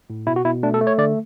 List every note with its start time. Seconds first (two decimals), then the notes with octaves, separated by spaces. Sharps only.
0.10 A2
0.27 B2 E4
0.36 F#4
0.45 B2 E4
0.63 A3 D4
0.74 A4
0.81 A3
0.87 C#5
0.98 D3 D5